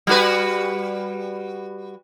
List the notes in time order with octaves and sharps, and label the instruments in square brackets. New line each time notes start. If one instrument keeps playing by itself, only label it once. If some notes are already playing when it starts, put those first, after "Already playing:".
[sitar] G3 F#4 B4